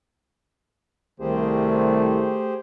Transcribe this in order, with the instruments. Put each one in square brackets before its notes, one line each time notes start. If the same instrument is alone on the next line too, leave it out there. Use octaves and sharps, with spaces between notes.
[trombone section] C2 [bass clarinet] D#3 [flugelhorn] A3 [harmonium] G4 G#4 C5